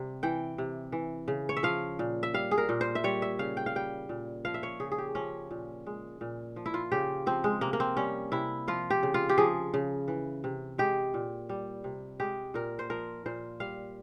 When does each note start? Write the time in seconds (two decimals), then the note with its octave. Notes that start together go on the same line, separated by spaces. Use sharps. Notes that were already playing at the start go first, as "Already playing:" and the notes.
Already playing: C3 G3
0.23 E3 G5
0.58 C3
0.92 E3
1.28 C#3
1.49 C#5
1.57 E5
1.63 F3 F5
1.99 A#2
2.23 E5
2.34 G3 F5
2.51 G#4
2.58 A#4
2.69 A#2
2.81 C5
2.95 E5
3.04 G3 C#5
3.22 E5
3.39 C#3 F5
3.57 G5
3.66 F5
3.75 G3 G5
4.09 A#2
4.45 F3 F5
4.54 E5
4.63 C#5
4.80 C#3 G#4
4.92 G#4
4.98 G4
5.15 F3 C#4
5.51 A#2
5.86 G#3
6.21 A#2
6.56 F3
6.66 E4
6.74 F4
6.92 C#3 G4
7.26 F3 C4
7.44 G#3
7.61 C3 A#3
7.73 A#3
7.80 C4
7.96 G3 C#4
8.32 C3 E4
8.68 F3 F4
8.90 G4
9.03 C#3
9.14 F4
9.29 G4
9.38 F3 G#4
9.74 C#3
10.08 E3
10.44 C3
10.78 G#3 G4
11.14 A#2
11.49 G3
11.84 C3
12.20 G#3 G4
12.54 A#2 A#4
12.79 C5
12.90 F3 A#4
13.26 A#2 C5
13.60 G3 F5